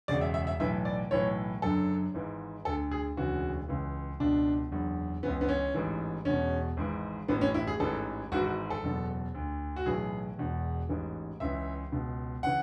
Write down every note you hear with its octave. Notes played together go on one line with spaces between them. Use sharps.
E1 E2 C#3 D5
E5
E5
E5
B1 A2 E3 E5
D5
B1 A2 E3 C#5
F#1 F#2 D3 A4
G#1 G#2 E3
D2 D3 A4
G#4
E1 D2 C#3 E3 F#4
C#2 C#3 E3
C#2 B2 D4
F#1 E2 D3
C#2 C#3 E3 B3
B3
C#4
A1 G#2 E3
E1 E2 B2 C#4
G#1 G#2 E3
A1 A2 E3 B3
C#4
E4
G#4
A1 G#2 E3 A4
G#1 G#2 E3 F#4
F#4
A4
F#1 E2 B2
D2 D3
F#4
B1 A2 E3 G#4
E1 E2 B2
A1 G#2 E3
C#2 C#3 E3 E5
C#2 B2
C#3 E3 F#5